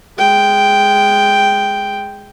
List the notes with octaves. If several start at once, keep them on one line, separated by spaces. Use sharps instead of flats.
G#3 G5